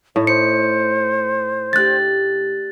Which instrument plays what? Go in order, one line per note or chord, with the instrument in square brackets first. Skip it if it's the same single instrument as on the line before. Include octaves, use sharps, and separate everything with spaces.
[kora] A2 [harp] D#4 [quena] C#5
[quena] C5 [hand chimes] C#7
[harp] A3 D4 G4 [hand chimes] F#6 A6